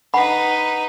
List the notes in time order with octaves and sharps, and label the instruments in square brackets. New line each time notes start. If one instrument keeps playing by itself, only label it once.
[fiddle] D#4 B4 [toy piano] F#5 B5